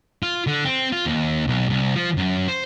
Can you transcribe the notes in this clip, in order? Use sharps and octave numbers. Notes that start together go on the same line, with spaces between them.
F4
D3
C4
F4
D#2
B1
C2
F3
F#2
C5